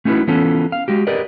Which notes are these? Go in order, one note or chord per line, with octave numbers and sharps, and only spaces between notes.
A3 C#4 D#4 E4 F#4 B4
E3 B3 C#4 F4 A4
F5
G#3 F#4 G4
G4 A#4 B4 D5 D#5